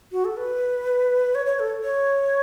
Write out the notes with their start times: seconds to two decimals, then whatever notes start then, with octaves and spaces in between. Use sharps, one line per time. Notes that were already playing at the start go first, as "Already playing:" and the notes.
0.12 F#4
0.25 A4
0.37 B4
1.35 C#5
1.46 C#5
1.59 A4
1.84 C#5